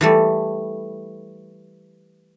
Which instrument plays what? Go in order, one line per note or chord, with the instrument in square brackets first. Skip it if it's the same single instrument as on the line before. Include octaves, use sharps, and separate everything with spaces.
[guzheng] E3 G3 A3